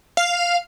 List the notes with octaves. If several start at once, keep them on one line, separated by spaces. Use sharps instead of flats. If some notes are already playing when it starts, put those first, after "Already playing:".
F5